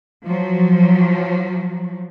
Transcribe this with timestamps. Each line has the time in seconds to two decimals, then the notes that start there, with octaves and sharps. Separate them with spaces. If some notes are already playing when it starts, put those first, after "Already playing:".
0.25 F3 F#3